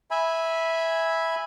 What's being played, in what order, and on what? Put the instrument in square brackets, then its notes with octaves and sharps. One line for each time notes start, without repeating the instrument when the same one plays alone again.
[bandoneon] E5 G#5 B5